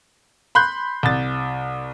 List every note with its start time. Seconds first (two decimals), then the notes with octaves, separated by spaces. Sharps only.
0.55 B5 C6 F#6 G6
1.03 C2 A6